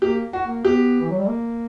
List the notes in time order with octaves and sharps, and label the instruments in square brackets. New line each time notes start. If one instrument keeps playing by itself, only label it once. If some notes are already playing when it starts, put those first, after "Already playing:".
[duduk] A#3 [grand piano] G4
[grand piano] F#4
[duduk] A#3
[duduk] B3 [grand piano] G4
[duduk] E3
F#3
G3
A#3